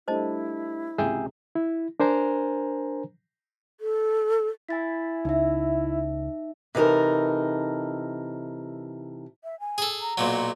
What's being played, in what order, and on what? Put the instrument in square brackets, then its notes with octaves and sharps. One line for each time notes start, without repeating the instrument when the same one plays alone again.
[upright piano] G3 A3 D4 [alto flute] E4 [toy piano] C5 D#5 A5
[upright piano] C#2 C3 [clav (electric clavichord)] G#4 E5 G5
[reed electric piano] E4
D4 A#4 C5 G#5 A#5
[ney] A4
[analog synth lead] E4 [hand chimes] G#5 A6 B6
[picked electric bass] C#2 [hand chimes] D#4 E5
[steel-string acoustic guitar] C3 E3 D#4 A4 A#4
[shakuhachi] E5
G#5
[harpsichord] G#4 A4
[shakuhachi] A#5
[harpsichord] B1 A#2 F#3